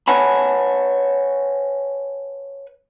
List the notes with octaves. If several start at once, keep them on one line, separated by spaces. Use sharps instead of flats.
B4 C#5 F#5 G#5 A5 B5